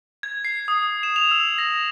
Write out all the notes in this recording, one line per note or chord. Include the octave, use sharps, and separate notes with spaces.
G#6
C7
D#6
E7
F7
E6
A#6